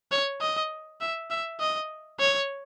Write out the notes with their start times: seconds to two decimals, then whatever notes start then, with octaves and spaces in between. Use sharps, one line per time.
0.12 C#5
0.41 D#5
1.01 E5
1.30 E5
1.60 D#5
2.20 C#5